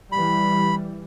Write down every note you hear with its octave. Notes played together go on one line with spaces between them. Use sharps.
E3 G3 B5